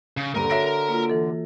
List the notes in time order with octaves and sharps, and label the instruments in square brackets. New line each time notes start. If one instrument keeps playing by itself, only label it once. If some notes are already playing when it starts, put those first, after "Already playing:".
[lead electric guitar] C#3
[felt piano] D#1 G2 D#7 [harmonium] D3 [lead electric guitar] A#4 A#5
[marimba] F#4 C#5 [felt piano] E5 A#6 D7
[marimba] A#3 F4
E3 A4